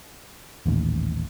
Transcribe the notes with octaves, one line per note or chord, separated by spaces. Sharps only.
D#1 A1 D#2